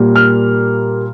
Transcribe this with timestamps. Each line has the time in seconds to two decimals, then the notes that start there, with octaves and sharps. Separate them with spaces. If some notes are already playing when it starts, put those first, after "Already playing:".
Already playing: A#2 G3 A#3
0.16 F6